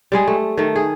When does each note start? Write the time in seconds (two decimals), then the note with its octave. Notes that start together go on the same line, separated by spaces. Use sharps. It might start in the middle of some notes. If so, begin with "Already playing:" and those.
0.12 G3 G#3 G#4
0.28 A3
0.57 D#3 A3
0.76 G#4